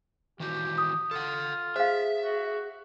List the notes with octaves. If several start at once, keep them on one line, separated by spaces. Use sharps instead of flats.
D#3 E3 F#4 G4
D#6
F4 A4 F#5
G#4 C5 E5 F5
F#4